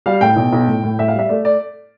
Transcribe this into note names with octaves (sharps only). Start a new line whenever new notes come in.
G3 F5
A2 G5
B1
B1
A2
A2
A2 E5
F5
G3
E5
A3 D5
D5